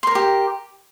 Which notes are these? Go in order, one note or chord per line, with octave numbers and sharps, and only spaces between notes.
G4 A#4 A#5 C6